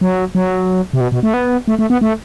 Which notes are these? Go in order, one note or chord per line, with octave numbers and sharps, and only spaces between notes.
F#3
F#3
C3
B2
B2
A3
B3
A3
A3
B3
A3